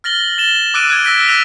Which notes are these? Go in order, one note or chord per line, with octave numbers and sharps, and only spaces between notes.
F6 A6 A#6 F#7 G7
A6 E7 G7
D6 E6 F#6 A6 D7 D#7
D6 F#6 G#6
E6 A#6 B6 D7
D6 E6 F#6 A#6 F7